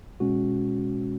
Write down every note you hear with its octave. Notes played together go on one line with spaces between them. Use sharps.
B2 G#3 C#4 F#4